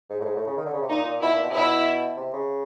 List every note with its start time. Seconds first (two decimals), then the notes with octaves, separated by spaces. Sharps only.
0.10 G#2
0.20 A2
0.25 G#2
0.36 A2
0.47 C#3
0.57 D#3
0.65 D3
0.73 C#3
0.82 C3
0.89 A#2 D#4
1.05 A#2
1.21 B2 E4
1.32 A#2
1.43 B2
1.50 C3
1.53 B2 E4
2.17 C3
2.33 C#3